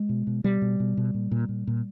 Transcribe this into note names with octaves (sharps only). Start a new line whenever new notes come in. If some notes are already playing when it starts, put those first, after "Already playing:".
Already playing: G#3
B2
B2
B2 G3
B2
B2
B2
A#2
A#2
A#2
A#2